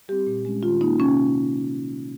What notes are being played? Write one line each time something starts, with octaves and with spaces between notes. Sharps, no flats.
G3 C4 G4
A#2
G#3 C#4
D#3 F4
A#3 C#4 D#4
C3 C#4